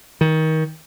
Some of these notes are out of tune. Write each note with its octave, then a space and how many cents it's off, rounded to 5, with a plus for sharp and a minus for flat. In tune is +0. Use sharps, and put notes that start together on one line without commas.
D#3 +25